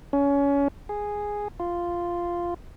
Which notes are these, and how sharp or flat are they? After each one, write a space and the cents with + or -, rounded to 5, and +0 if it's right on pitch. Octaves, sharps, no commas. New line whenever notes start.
C#4 +25
G#4 -5
F4 -5